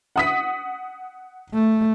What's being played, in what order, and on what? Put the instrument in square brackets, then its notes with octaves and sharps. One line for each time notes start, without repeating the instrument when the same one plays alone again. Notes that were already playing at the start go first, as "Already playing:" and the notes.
[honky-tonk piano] F#5 D#6 B6
[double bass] A3